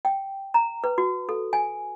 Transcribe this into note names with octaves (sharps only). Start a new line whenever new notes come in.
G5
A#5
B4
F#4
A4
G#5